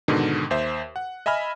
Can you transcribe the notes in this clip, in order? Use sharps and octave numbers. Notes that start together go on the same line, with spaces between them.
G#2 B2 D3 D#3
D#2 C5 E5
F#5
D#5 E5 G#5 B5 F6